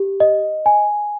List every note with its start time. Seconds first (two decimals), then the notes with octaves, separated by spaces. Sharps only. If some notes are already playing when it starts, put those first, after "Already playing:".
Already playing: G4
0.20 D#5
0.66 G#5